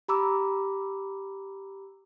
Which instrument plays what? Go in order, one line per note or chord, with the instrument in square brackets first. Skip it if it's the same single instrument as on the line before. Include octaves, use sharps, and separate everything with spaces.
[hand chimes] G4 A#5 B5 D6 E6